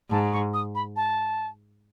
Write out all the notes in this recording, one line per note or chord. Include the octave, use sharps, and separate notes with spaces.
G#2 A5
C#6
D#6
B5
A5